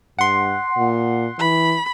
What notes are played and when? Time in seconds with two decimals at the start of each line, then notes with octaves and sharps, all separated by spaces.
0.19 G2 F#5 C6
0.78 A#2
1.39 E3 B5